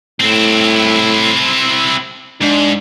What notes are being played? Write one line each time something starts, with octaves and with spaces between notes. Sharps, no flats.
A2 C4 E4
G#2 D4